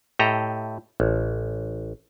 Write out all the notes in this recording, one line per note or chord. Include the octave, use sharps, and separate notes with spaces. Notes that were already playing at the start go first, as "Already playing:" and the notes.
A2 G4 A4 D#5 A#5
A1